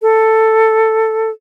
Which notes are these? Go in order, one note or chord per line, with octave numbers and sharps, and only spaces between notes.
A4